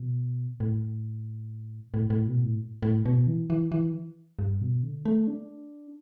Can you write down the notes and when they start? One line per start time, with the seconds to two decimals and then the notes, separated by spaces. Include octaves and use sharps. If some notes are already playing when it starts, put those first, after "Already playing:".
Already playing: B2
0.60 A2
1.94 A2
2.10 A2
2.27 B2
2.44 A2
2.82 A2
3.05 B2
3.27 E3
3.50 E3
3.72 E3
4.39 G2
4.61 B2
4.83 D3
5.05 A3
5.27 D4